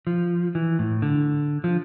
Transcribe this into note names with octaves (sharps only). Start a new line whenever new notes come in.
F3
E3
A2
D3
F3